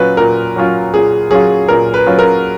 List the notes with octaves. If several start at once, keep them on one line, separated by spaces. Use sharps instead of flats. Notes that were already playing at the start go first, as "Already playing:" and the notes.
Already playing: A#2 F#3 C#4 F4 B4
A#2 A#4
F#3 C#4 F4
A#2 G#4
F#3 C#4 F4 G#4
A#2 A#4
B4
F#3 C#4 F4
A#4